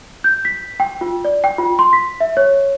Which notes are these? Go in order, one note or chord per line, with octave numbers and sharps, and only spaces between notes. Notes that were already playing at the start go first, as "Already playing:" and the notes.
G6
B6
G5
F4
D5
G5
F4
C6
B6
E5
C#5